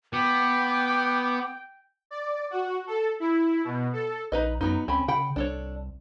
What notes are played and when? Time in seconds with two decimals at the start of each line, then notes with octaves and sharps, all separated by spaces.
0.13 B3 G5 D6
2.11 D5
2.51 F#4
2.87 A4
3.20 E4
3.64 B2
3.93 A4
4.32 A#1 D#4 B4 D#5
4.61 F#2 F#3 B3 D#4
4.88 C#2 C4 C#4 B5
5.08 C#3 F#5 G5 B5
5.36 C2 D4 A4 C#5